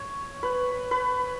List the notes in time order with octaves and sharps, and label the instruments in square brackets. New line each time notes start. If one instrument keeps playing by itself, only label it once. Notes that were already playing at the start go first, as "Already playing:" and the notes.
Already playing: [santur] C#5
B4
B4